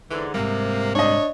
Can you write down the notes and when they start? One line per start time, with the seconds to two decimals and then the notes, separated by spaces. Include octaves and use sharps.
0.10 G#2 D3 E3
0.34 G#2 C3 G3 A#3
0.95 D4 C#5 D#5